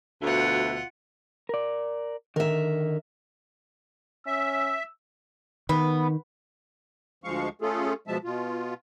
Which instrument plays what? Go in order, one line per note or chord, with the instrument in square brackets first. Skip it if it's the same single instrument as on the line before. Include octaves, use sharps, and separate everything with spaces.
[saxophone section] D2 B2 E5 [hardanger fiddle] F4 F#5
[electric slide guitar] A#4 D5
[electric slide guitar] D3 D#3 [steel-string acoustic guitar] A#4 E5
[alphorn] C#4 [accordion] E5 [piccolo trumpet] E6
[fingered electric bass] D#3 [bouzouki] B3
[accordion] D2 F3 G#3 F5 C#6
A3 C#4 F4 G#4 A4
B2 F3 G#3 E5 A5
B2 F4